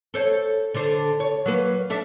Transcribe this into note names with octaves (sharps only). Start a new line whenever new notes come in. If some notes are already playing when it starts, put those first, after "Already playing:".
A4 C5 C#5
D3 A4 C5
C#5
F#3 A#3 B4
D4 A4 E5